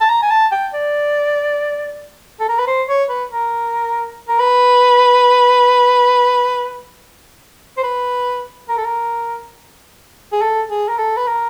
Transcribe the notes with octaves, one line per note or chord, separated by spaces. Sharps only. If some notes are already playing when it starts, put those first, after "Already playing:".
A5
A#5
G#5
A5
G5
D5
A4
A#4
B4
C5
C#5
B4
A#4
A#4
B4
C5
B4
A#4
A4
A#4
G#4
A4
G#4
A#4
A4
B4
A#4